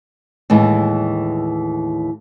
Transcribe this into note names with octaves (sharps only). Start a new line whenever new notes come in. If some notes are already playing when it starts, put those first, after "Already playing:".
D#2 A2 E3 G#3